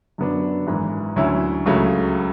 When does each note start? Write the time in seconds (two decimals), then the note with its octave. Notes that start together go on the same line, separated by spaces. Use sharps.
0.18 F#2 D3 F#3 B3 D4
0.67 G#1 G#2 E3
1.16 D2 D3 F#3 C#4 E4
1.66 C#2 C#3 F#3 A3